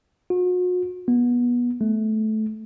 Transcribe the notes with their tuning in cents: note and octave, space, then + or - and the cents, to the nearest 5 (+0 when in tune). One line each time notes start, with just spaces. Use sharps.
F#4 -40
B3 -25
A3 -20